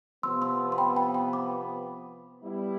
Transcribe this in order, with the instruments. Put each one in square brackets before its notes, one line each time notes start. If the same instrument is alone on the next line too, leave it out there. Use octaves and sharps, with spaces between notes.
[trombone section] C3 F3 B3 [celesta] C6 E6
[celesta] C6 E6
C6
G5 B5
G5 B5
G5 B5
B5 D6
[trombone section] G3 B3 E4